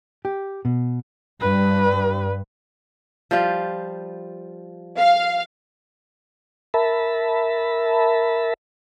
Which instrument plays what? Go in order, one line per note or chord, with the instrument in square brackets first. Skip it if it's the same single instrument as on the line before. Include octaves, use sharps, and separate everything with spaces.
[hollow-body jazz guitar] G4
B2
[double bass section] G2 [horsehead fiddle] B4
[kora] F3 G3 F4
[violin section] F5
[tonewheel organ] A#4 E5 A5 B5